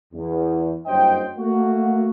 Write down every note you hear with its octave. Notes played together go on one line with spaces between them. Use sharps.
E2
F#1 G2 F#3 C5 D#5 G5
A3 A#3 F#4